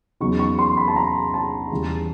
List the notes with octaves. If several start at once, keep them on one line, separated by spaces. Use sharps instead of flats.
E2 C#3 F#3 B3 D#4 C#6
C#6
C6
B5
A5
A#5
A5
E2 C#3 E3 G3